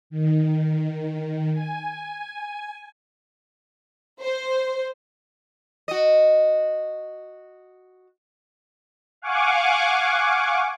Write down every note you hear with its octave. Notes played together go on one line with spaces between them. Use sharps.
D#3
G#5
C5
F#4 D#5
F5 F#5 G#5 C#6 D6